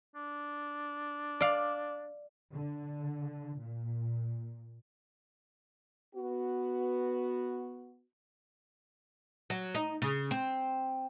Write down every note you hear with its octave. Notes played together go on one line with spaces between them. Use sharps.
D4
D5 F5
D3
A#2
B3 F#4
F#3
D#4
C#3
C4